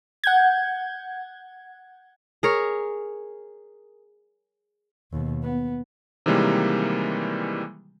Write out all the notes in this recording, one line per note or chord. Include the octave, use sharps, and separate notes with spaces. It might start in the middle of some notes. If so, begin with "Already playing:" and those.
F#5 G6 G#6
G#4 A#4 C#5
D#2 B2
B3
C3 D#3 E3 G3 G#3 A#3